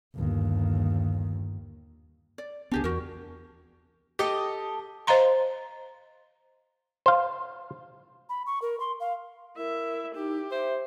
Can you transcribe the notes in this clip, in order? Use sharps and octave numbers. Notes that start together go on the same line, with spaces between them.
G1 D#2
D5
C#2 B3 D4 G4 G#4
E2 F#4 A#4
G4 A4 D#5
C5 D#5 F5 A#5 C6
C5 F5
B5
C#6
A#4
C6
F5
E4 A#4 E5
D#4 G4
C5 E5